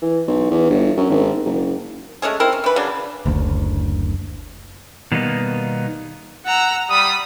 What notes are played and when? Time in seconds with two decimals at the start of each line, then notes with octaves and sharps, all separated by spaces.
0.02 E3
0.28 B1
0.51 E2
0.70 G1
0.97 F#2
1.10 G#1
1.46 F#1
2.22 G#3 A3 C#4 G#4
2.40 C4 E4 A#4
2.53 C#4
2.64 E3 B4
2.76 C#3 F#3 D4
3.26 F#1 D2
5.12 B2 D#3 G3 A#3 B3 D#4
6.45 F#5 A#5 E6
6.90 G3 B5 D#6